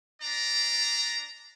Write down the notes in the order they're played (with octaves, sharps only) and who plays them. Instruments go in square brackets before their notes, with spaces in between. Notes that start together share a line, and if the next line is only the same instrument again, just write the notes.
[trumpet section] D4 D5 A#5